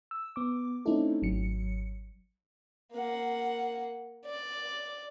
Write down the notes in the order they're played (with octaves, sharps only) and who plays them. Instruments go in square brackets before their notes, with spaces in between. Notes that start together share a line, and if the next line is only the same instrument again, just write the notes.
[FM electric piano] E6
B3 D6
A3 C4 C#4 D#4 E4 A4
G#1 F#3 C#7
[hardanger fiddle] A#3 F#5
D5